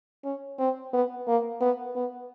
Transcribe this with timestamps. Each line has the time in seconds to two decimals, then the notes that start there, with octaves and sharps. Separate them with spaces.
0.24 C#4
0.59 C4
0.93 B3
1.27 A#3
1.61 B3
1.95 B3